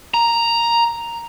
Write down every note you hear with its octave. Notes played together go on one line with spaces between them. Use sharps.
A#5